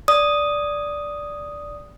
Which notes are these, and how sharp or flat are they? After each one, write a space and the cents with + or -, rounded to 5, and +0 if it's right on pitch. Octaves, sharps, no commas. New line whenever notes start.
D5 -5 D#6 +0